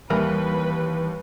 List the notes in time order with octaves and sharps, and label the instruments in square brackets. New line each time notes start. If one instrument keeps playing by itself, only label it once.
[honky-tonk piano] D#2 [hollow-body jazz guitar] E3 A#4 B5 [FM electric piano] G3 [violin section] B4